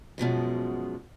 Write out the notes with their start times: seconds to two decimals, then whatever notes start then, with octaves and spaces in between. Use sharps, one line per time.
0.18 F#2 B2 F3 G#3